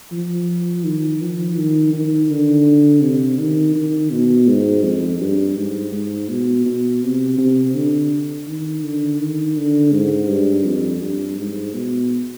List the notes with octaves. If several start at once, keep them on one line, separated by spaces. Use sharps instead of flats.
F3
D#3
F3
D#3
D#3
D3
C3
D#3
D#3
B2
G#2
F2
G2
G#2
G#2
B2
B2
C3
C3
D3
D#3
D3
D#3
D3
G#2
G2
F2
G2
G#2
B2